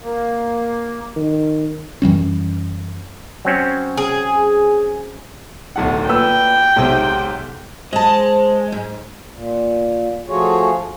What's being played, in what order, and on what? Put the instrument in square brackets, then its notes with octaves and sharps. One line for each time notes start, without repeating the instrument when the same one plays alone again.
[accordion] A#3
[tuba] D#3
[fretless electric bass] F#2 E3 G3 C#4
[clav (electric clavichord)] F#3 C4 C#4
[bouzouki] G#4
[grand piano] D1 B1 F#5
[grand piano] A#2 B4 E6 [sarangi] G5
[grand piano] B1 G#2 C3
[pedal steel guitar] G#3 [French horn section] C5 [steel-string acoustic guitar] D#5 A5
[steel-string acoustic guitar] G#2
[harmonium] A#2
F3 A3 F4 F#4 G#4 C#5